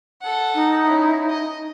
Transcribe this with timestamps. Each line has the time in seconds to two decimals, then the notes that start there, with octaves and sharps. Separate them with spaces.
0.21 A4 F#5
0.54 D#4
0.85 C#4 E4
1.29 D#5